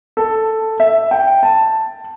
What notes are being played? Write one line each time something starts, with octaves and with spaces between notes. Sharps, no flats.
A4
E5
G5
A5